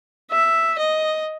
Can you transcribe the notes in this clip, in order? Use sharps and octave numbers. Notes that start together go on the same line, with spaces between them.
E5
D#5